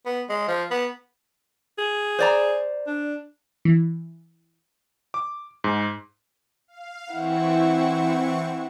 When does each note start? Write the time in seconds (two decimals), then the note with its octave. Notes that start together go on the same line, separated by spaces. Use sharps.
0.06 B3
0.29 G#3
0.48 F3
0.71 B3
1.78 G#4
2.19 C5 D5 A#5
2.87 D4
3.65 E3
5.14 D6
5.64 G#2
6.68 F5
7.12 E3 C4 E4 F#5 C#6